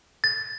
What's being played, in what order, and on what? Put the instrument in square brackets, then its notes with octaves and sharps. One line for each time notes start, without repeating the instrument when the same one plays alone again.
[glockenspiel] A6